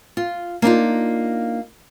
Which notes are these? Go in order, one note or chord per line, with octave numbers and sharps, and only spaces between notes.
F4
A#3 D4 D#4 F4